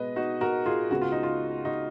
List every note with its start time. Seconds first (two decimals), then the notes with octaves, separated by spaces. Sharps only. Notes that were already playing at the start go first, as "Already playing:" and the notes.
Already playing: B2 G#3 B3 B4 D#5
0.16 D#4 F#4
0.41 F#4 A#4
0.66 F4 G#4
0.91 C#2 C#3 G#3 B3 F#4
1.01 F4
1.12 D#4
1.23 F4
1.65 D#4 F#4